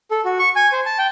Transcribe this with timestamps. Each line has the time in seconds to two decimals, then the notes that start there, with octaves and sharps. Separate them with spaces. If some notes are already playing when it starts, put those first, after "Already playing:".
0.11 A4
0.25 F#4
0.39 C#6
0.56 G#5
0.72 C5
0.86 A5
0.98 G5